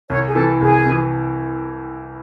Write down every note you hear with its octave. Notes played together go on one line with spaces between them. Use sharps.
C2 C#5
G#4
C3 E3 A4
C2 G#4
C3 E3